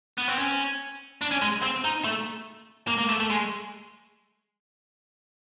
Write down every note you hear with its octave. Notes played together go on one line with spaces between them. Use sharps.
B3
C4
C#4
D4
C#4
G#3
C4
D#4
A3
A#3
A#3
A3
A3
G#3